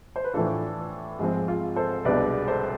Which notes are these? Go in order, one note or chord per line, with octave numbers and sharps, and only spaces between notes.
C5
B4
A2 E3 A3 D4 F4 A4
G#2 F3 G#3 C4 G#4
F4
A4 C5
C2 B2 G#3 D4 B4 D5
A4 C5